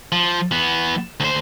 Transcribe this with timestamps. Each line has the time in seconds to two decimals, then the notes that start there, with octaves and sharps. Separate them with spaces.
0.12 F3
0.51 E3 B3
1.20 D2 C5